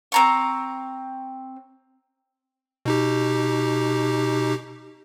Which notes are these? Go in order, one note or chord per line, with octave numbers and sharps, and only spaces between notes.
C4 A#5 C#6
B2 D#4 G4